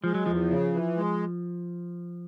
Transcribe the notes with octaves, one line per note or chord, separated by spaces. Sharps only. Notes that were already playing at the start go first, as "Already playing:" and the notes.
F3 G#3
F#3
E2 F3
C#3
E3
G#3